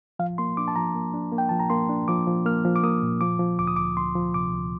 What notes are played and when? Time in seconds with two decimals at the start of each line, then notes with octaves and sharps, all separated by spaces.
0.19 F3 F5
0.38 A#3 C6
0.57 D4 D6
0.68 A5
0.76 F3 A#5
0.95 A#3
1.14 D4
1.32 A#3
1.38 G5
1.49 F3 A5
1.60 A#5
1.70 A#3 C6
1.89 D4
2.08 F3 D6
2.27 F3
2.45 A#3 F6
2.65 F3
2.76 D6
2.83 A#3 D#6
3.03 A#2
3.21 F3 D6
3.39 F3
3.59 D2 D6
3.67 D#6
3.76 D2 D6
3.97 D2 C6
4.15 F3
4.34 C3 D6
4.53 D2